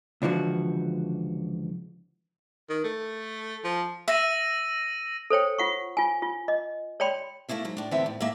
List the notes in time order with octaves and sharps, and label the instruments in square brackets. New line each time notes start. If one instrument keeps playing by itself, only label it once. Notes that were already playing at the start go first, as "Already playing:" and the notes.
[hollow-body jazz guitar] C#2 D3 E3 F3 F#4
[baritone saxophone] D#3
A3
F3
[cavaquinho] E5 [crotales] E6 A#6 D#7
[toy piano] A4 C5 C#5 G5
F4 F#5 C#6
F4 G#5
F4
D#5
C#5 D5 G5 B5 C6
[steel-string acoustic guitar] A3 A#3 D4 E4 E5
G#2 F#3
A2 D4
A2 D3 E3 B3 C4 E5
A2
A2 A#3 D#5 E5